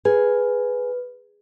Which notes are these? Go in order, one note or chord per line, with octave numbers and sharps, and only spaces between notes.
G#4 B4